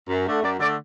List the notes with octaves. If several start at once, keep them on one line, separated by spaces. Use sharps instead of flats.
F#2
D3 A3
F#2 D5
D3 A3 D5